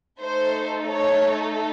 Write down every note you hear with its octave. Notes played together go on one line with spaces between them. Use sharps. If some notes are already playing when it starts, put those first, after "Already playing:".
A3 D#4 A4 C5
C#5